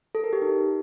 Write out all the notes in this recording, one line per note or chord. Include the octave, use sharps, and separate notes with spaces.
A4
A#4
G4
D#4